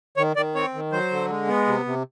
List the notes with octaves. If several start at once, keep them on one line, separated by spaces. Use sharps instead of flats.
D#3 C#5
D#3 D5
C4 C#5
D#3
F#3 C5
D3
G#3
B3
C3
C3